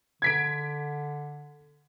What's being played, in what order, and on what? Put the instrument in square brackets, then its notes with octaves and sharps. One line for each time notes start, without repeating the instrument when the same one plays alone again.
[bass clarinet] D3 [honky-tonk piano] G#6 B6 D7